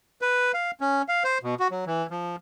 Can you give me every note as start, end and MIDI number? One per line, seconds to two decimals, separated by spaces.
0.21 0.52 71
0.54 0.71 77
0.81 1.02 61
1.08 1.23 77
1.24 1.38 72
1.43 1.55 47
1.60 1.68 66
1.71 1.85 54
1.87 2.07 52
2.10 2.36 53